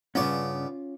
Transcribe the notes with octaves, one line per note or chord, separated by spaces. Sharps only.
G2 C#3 B3 C#4 F4 C#5 D5